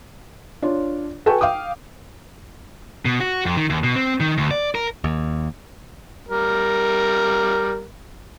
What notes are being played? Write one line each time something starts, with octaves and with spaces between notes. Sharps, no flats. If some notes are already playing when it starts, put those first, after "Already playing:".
D4 F4 C#5
F#4 A4 B4 G5 G#5 C#6
F5 G5 D6 D#6
B2
F#4
F2
D#3
D#2
B2
C4
D#3
D2
D5
A#4
D#2
G3 A#4